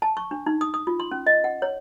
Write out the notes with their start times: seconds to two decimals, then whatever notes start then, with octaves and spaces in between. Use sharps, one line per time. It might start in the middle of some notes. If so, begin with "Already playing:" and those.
0.02 A5
0.17 C#6
0.31 D4
0.46 D#4
0.61 D#6
0.74 D#6
0.87 F4
1.00 C6
1.11 C#4
1.26 D#5
1.44 F#5
1.62 C#5